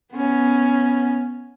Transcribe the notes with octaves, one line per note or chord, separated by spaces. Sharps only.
B3 C#4